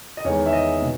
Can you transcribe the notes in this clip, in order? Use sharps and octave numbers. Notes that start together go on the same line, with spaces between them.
D#5
E2 D#3 G#3 C#5
E5
D#5
B2